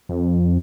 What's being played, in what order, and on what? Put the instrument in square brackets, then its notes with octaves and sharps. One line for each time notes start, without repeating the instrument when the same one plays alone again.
[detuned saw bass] F2